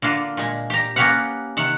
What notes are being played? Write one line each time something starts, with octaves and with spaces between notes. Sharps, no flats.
D3 A#3 D4 F4
A#2 G#3
G4 A#5
A#3 B3 C#4 G4 F5 F#5
C3 D#3 F#5